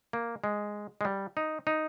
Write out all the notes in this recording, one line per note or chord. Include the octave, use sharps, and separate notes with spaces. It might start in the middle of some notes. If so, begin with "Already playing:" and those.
A#3
G#3
G#3
G3
D#4
D#4